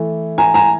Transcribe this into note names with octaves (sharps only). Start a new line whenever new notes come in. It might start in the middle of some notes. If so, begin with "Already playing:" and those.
Already playing: E3 A3
G#5 A#5
G#5 A#5